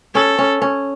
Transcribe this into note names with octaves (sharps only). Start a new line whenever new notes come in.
C#4 A4
C#4
C#4